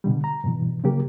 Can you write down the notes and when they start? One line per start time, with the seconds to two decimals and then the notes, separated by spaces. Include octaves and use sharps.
0.04 B2 D3 G3
0.24 A#5
0.44 G2 B2 E3
0.84 C#3 F#3 A#3 G4 A#4